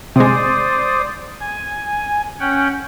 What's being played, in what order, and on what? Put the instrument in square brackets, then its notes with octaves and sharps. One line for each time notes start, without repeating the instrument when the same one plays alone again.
[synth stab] C3 G#3 [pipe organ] C5 D5 D#6
[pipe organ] G#5
C#4 F#5 G5